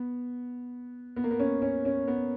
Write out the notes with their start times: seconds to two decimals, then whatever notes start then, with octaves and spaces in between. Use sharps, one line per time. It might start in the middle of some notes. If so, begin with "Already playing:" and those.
Already playing: B3
1.16 B3
1.24 A#3
1.31 B3
1.40 C#4
1.62 C#4
1.85 C#4
2.08 B3